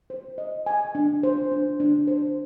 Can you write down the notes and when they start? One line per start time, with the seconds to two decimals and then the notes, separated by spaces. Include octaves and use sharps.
0.10 C5
0.38 D#5
0.66 G#5
0.95 D4
1.23 C5
1.52 D4
1.80 D4
2.07 C5